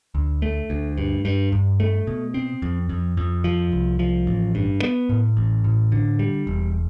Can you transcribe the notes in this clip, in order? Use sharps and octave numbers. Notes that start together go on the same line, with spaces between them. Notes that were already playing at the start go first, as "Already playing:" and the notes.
D2
A3
D2
G2
G2
G2
A3
B2
C4
F2
F2
F2
F3
C2
F3
A1
G2
B3
A2
A1
A2
D3
G3
E1